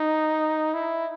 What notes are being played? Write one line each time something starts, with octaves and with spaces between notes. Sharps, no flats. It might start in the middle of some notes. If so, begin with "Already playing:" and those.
Already playing: D#4
E4